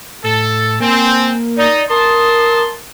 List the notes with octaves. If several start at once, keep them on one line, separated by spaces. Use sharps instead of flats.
A2 A4
A#3 C4 G#5
D#4 D5
A#4 A5 C6 D#6